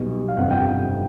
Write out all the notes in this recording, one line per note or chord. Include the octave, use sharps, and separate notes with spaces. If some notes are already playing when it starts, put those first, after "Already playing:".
Already playing: B1 B2 G3
F5
G1 F2 C3 F#5
G5